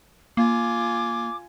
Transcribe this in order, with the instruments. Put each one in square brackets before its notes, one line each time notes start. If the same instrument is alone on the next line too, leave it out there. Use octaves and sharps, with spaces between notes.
[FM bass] A#3 [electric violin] F4 G#5 [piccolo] D6